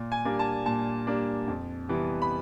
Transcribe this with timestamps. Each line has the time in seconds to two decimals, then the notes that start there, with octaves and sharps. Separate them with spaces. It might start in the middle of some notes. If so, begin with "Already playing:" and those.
Already playing: A#2
0.12 G#5
0.25 G3 A#3 D4
0.39 A5
0.66 A#2 A5
1.07 G3 A#3 D4
1.48 F2
1.89 C3 E3 G3 B3
2.22 B5